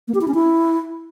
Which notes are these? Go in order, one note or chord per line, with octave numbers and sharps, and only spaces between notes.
A#3
G4
E4
C#4
E4